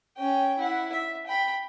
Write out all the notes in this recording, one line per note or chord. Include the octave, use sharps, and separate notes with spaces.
C#4 G5
E4 F#5
E5
G5 B5